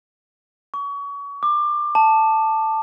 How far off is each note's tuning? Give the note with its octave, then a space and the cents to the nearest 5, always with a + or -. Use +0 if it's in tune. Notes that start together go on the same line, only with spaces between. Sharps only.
C#6 +30
D6 +25
A5 +5